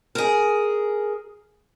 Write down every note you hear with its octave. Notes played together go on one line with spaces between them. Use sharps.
G#4 A#4